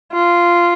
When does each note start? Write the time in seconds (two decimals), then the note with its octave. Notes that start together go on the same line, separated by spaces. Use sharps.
0.13 F4